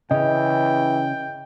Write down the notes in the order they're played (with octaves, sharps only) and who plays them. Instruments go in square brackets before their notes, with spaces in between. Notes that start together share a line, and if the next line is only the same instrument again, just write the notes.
[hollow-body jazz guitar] C#3 C#4 [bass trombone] E3 [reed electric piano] D#5 [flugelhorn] G5